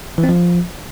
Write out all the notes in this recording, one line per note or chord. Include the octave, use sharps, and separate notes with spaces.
E3
C4
F3